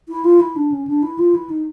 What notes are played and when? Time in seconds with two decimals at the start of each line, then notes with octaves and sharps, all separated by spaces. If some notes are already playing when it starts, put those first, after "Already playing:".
0.09 E4
0.24 F4
0.40 E4
0.56 D4
0.72 C#4
0.87 D4
1.03 E4
1.19 F4
1.35 E4
1.49 D#4